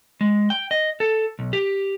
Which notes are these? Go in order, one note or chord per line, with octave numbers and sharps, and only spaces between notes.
G#3
G5
D#5
A4
B1
G4